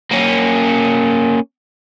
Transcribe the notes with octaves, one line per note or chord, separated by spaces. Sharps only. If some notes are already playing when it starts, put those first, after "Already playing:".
A#3 C#4